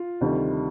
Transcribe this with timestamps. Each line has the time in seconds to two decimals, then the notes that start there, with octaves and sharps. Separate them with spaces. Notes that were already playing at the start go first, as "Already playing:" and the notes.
Already playing: F4
0.21 D2 C3 D#3 G3